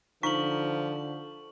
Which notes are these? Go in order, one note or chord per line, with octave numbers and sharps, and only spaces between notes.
D3 F3 D#4 C#6 F#7